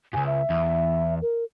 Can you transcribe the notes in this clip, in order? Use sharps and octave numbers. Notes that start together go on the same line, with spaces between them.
C#2 G2 G#5
E5
E2
A#4